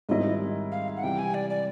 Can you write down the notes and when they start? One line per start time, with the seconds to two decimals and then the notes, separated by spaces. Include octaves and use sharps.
0.09 G#2 D#3 G3 C4 E4 D#5
0.72 F5
0.97 F#5
1.03 C3 E3 G3 G5
1.19 G#5
1.34 D5
1.50 D5